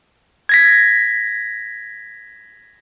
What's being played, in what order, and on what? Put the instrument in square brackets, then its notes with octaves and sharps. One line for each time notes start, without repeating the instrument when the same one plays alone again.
[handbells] G#6 A#6 B6